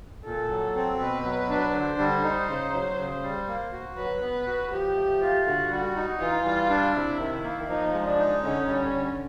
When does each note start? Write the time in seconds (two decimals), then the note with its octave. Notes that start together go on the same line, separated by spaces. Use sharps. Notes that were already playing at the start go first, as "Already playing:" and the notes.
0.25 A#2 A4
0.50 F#3
0.76 C4
1.00 B2 B4
1.24 F#3
1.49 D4
1.74 D3 C5
1.99 G3
2.23 D#4
2.48 C#3
2.73 F#3
2.98 C#3
3.22 G3
3.48 A#3
3.72 F#4
3.96 F#3 B4
4.21 B3
4.46 F#4
4.71 F3 G4
4.95 A3
5.21 F4
5.46 D3 F#4
5.70 G3
5.96 D#4
6.20 E3 F4
6.45 G3
6.70 D4
6.94 C3 E4
7.19 D#3
7.44 A#3
7.69 F3 D#4
7.93 G#3
8.06 D4
8.18 D#4
8.43 D3 C#4
8.67 G3
8.93 D3